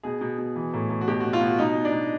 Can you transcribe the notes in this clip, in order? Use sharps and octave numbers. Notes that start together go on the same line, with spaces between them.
B2 G#4
B2
B2
E3
A2
A2
F#4
B2 G4
B2 F#4
F4
B2 F#4
B2 D#4
B2
D4
B2